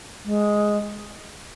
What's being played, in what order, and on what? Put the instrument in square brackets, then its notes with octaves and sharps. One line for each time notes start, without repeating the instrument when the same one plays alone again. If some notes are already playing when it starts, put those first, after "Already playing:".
[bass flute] G#3